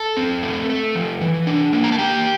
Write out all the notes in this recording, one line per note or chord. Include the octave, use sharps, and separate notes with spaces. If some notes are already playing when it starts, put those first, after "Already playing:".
Already playing: A4 A5
C4
A3
A3
F3
E3
D4
A#3
A#5
A5
A#3 G4 G5